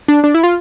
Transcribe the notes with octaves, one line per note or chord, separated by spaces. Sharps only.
D4
D4
E4
F4